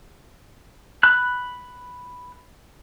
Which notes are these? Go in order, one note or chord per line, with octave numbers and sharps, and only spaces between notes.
B5 F#6